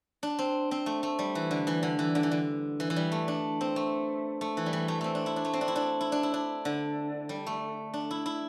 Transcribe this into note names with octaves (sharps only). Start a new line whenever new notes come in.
D4
C4
C4
A3
A3
G3
E3
D3
E3
D3
E3
D3
E3
D3
E3
E3
G3
A3
D4
C4
A3
A3
E3
G3
E3
A3
A3 C4
D4
E4
D4
A3
C4
D4
E4
D4
E4
D4
E4
D4
D3
G3
A3
D4
E4
E4